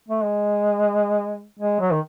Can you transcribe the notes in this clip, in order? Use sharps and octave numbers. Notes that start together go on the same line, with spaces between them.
A3
G#3
G#3
F#3
D#3